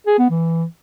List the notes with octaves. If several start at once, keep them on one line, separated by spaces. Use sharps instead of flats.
G#4
B3
E3